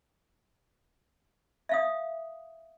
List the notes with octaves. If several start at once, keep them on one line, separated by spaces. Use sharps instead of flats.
E5 F5 D#6